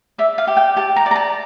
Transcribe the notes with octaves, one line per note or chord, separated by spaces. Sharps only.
D5 E5
F5
G4
G5
G4 A5
A#5
D5
A#5
A5